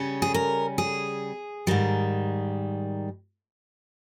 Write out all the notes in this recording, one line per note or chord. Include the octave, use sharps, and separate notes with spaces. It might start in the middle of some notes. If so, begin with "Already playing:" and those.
Already playing: C#3 G3 C#4
G#4
A#4
G#4
G#2 D#3 G3